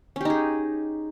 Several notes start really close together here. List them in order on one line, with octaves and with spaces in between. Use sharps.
C#4 G4 D#4 G#4